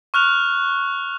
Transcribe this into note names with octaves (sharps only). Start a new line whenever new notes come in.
C#6 F6 F#6 F7